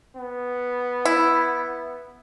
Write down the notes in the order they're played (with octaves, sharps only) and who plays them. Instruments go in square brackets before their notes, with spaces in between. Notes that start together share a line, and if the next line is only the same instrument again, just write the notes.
[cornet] B3
[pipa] E4